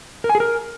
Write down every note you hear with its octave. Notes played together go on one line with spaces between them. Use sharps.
A#4
G#5
G#4
A#4